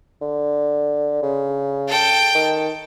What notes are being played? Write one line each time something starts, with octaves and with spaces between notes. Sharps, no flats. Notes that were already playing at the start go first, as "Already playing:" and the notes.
D3
C#3
A4 G5
D#3